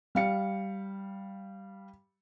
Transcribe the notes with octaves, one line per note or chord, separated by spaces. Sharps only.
G3 F5 C#7